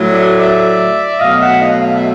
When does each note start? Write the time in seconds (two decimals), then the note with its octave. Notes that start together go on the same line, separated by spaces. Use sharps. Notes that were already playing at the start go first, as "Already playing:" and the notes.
Already playing: A2 F#3 A3
0.11 D5 E5
0.39 D5 E5
1.19 B2 F#3 A3 D#5 F5
1.39 E5 F#5
1.59 D#5 F5
1.79 D#5 F5
1.96 E5